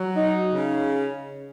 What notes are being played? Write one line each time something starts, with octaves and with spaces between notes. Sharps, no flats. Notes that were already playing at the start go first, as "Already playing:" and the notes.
Already playing: F#3
D#4
C#3